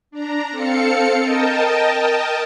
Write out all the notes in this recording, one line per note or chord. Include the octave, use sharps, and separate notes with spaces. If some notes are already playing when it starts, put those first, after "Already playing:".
D4 A#5
C4 A4 F5 C#7
A#4 D#5 G5 A5